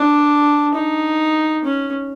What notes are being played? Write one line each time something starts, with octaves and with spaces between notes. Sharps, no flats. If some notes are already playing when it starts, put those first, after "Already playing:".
Already playing: D4
D#4
C#4